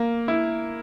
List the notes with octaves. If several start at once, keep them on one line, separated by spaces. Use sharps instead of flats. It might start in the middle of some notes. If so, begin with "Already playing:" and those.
Already playing: A#3
E4